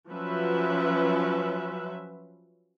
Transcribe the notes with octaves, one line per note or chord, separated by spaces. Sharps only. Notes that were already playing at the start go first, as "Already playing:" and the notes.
F3 F#3 C#4 B4 E5